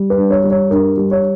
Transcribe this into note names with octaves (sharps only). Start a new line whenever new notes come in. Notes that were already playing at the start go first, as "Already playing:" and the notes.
Already playing: G3
B4
G2
C#5
G3
C#5
G2 A#4
G3
C#5